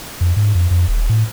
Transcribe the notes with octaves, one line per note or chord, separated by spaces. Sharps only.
F2
G#2
F2
F2
D#1
A2